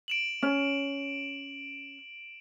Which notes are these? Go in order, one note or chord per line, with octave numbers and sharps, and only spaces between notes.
D7 E7 F#7
C#4